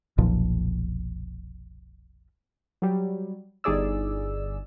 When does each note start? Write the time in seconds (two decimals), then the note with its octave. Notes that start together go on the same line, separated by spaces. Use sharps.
0.18 F1 B1 A#2 F3
2.82 F#3 G3
3.64 G1 D#4 G#4 D5 E6